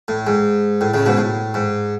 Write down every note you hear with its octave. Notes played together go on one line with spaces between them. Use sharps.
A2
G#2
A2
A2 C#3
G#2 B2
A2
G#2